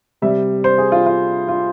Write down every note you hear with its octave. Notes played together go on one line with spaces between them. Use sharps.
C3 G3 E5
C5
G#4
F4
F4
F4